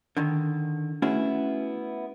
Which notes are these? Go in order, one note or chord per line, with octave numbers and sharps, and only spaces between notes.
D3 D#3
A3 B3 C#4 E4 F#4 G#4